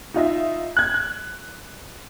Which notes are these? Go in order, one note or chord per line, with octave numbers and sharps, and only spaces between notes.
D#4 F4 D#5 E5
F#6 G#6
F#6